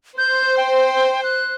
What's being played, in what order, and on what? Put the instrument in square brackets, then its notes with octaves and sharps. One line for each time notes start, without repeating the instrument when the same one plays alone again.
[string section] C5 [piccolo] G6
[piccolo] G5
F#6